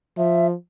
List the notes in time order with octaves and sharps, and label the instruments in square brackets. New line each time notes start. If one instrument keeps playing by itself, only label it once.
[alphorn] F3 [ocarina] E5